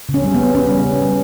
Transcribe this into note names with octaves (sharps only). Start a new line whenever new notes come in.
C#3
C#4
G3
B3
G3
C#3 C#4
G3
C#3
G3